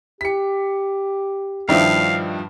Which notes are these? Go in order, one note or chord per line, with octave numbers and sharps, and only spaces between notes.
G4 B6 C#7
G2 D#3 F3 D4 E4 F5